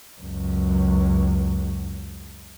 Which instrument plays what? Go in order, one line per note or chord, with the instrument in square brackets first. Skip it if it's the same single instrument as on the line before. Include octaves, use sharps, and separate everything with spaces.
[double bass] C#2 F#2